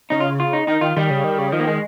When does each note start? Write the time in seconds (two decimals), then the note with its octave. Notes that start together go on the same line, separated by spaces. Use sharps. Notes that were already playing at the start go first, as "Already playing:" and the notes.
0.10 C#3 D#4
0.20 F4
0.40 F4
0.53 D#4
0.67 D#3 D#4
0.81 D#3 F4
0.97 D#3 G3
1.10 C#3
1.24 D#3
1.38 C#3
1.52 D#3 F3
1.60 A#3
1.67 G#3